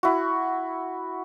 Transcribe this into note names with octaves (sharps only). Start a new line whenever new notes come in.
E4 F#4